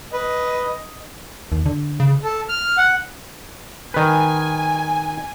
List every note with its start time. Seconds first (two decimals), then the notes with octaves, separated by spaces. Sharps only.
0.13 B4 D#5
1.52 D#2
1.66 D3
2.00 C#3
2.24 A4
2.49 F6
2.78 F#5
3.94 D#3 B4 G#5